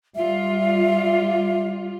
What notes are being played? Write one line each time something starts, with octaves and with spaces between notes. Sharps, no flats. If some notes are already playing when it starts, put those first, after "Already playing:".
G3 F4 E5